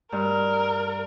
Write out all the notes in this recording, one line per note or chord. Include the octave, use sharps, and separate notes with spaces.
G2 A#4